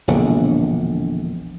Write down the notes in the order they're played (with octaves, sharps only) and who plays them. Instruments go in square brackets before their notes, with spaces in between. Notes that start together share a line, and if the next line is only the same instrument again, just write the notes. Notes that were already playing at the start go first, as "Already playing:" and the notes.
[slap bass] E1 A#1 D3